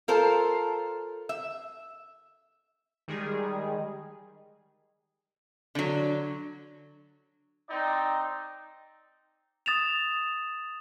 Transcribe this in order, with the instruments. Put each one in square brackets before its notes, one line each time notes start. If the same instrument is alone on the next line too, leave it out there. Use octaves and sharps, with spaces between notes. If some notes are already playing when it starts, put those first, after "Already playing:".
[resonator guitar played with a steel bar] F4 A4 A#4 C5
E5
[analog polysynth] D#3 G3 G#3 G#4
[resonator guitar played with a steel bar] D3 F#3 [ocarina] D4
[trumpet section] C4 D#4 D5
[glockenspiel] D#6 A6 E7 F7